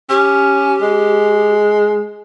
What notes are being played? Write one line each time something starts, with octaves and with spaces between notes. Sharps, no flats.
C#4 G4
G#3